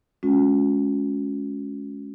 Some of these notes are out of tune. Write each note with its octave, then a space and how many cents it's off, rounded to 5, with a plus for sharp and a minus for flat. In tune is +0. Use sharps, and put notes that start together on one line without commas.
G#3 +25 C#4 +5 F#4 -45